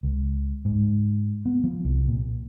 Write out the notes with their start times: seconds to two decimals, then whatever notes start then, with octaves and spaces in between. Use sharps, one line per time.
0.03 C#2
0.65 G#2
1.46 B3
1.64 F3
1.85 C2
2.08 A#2